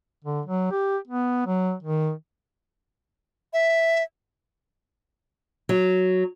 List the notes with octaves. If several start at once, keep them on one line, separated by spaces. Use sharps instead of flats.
D3
F#3
G4
B3
F#3
D#3
E5
F#3